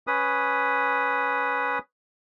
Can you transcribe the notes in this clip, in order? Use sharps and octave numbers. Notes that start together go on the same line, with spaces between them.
C#4 B4 D#6